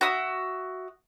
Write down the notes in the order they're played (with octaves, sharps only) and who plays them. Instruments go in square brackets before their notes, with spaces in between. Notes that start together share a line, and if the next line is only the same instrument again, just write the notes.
[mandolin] F#4 E5 D#6